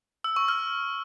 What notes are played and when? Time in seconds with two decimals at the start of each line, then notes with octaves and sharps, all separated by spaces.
0.24 E6
0.36 C#6
0.48 F6